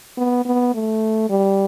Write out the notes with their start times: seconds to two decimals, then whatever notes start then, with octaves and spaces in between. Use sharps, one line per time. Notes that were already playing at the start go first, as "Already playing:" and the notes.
0.17 B3
0.45 B3
0.74 A3
1.30 G3